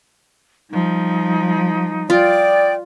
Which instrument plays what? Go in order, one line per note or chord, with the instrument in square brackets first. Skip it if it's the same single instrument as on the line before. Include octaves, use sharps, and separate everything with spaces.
[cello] F3 G3 [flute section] D#4
[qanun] F4 [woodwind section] D5 [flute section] G5 D#6 G6